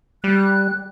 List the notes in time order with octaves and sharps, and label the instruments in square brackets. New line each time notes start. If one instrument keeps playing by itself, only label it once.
[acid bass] G3 [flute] F#6